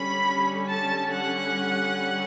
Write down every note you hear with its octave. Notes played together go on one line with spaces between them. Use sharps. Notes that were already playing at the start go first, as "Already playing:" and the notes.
Already playing: D3 G3 C#4 B5
A5
F#5